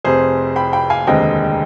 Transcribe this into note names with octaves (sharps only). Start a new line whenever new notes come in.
F1 F2 C3 G#4 C5
G5 B5
G5 B5
F5 G#5
F1 D#2 D3 G#3 C4 D#5 G5